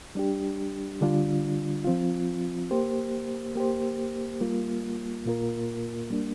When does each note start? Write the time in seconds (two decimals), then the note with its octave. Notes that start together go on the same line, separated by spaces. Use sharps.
0.15 G3 D4 G4
1.01 D3 G3 D4 F4
1.85 F3 C4 F4
2.71 A#3 G4 C5
3.55 A#3 G4 C5
4.41 G3 A#3 F4
5.25 A#2 A#3 F4 A#4
6.10 G3 A#3 D4